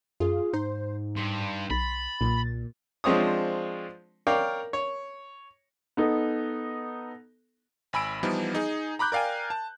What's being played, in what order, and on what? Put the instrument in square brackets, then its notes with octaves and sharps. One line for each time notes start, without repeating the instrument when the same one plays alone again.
[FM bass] F#2 [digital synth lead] F4 [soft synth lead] G#4
[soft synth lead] G#2 [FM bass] D#4 [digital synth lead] C5
[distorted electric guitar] G2 [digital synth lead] C6
[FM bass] B1 [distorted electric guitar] B5 [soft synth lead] A6
[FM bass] B1 [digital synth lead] A#2
[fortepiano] F3 G#3 C4 D4 C#5 D#6
A#4 C#5 D5 F5 G5
C#5
[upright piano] B3 D#4 A4
[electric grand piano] G#1 G#5 B5 E6 D7
E3 F3 G3 B3 D#4
D#4 G#4
A#5 B5 D6 F#6 G6
A#4 D5 F5 G5 G#5
A5